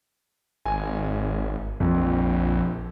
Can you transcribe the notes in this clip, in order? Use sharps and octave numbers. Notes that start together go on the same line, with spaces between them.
G#1 G#5
A#1 F2